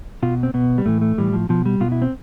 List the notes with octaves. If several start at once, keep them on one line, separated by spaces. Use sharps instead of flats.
B2 F4
C4
B2 B3
G3
A2 E3 A3
A3
A2 E3 G3
F3
B2 F3
G3
B2 F4
E4
C4